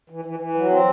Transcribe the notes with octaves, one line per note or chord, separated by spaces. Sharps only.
E3
E3
E3
F#3
C4